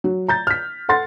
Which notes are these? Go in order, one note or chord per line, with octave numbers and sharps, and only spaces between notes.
F#3
A#5 G6 A6
F6 B6
A4 F#5 C6 A6